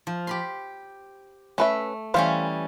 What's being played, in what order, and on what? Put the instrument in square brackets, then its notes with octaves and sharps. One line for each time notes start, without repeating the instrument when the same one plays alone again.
[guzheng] F3
G4 B5 C6
[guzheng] A3 [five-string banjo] C#4 B4 E5
[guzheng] E3 G3 C#4 [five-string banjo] A3 C5 F5